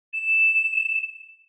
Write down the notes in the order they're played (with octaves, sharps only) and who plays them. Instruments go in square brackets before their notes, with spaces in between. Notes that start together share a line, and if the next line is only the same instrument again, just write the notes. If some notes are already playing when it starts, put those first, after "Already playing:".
[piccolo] E7